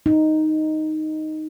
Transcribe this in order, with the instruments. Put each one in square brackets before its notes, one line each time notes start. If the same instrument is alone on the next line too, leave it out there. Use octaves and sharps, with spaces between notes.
[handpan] D#4